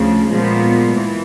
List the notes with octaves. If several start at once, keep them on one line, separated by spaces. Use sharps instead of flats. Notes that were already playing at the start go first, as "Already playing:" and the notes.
Already playing: D2 C#3 F3
A#2 F3 G#3 B3
E3